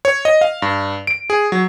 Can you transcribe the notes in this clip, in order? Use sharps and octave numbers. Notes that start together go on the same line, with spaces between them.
C#5
D#5
F5
G2
D7
G#4
F#3